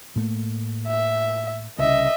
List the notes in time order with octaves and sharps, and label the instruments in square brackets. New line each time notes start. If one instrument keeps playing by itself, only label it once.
[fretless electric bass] A2 A3 A#3
[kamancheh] E5
[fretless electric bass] C2 C#3 [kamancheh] D#5 E5